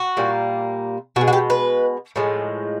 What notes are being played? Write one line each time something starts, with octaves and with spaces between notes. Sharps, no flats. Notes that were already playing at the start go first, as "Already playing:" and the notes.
Already playing: F#4
A#2 G3 A#3
B2 G#3 F#4
F#4
G4
B4
A2 F3 G#3